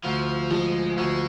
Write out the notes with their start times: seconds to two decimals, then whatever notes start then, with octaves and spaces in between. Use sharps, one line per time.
0.04 D2 F3
0.51 F3 G#3
0.97 D2 G#3